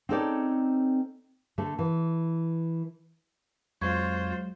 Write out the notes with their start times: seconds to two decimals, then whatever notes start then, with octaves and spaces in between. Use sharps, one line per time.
0.09 C4 C#4 D#4 A4 C#5 D5
1.58 D3 A3
1.79 E3
3.82 F2 F#3 G#3 F4 C5 C#6 G#6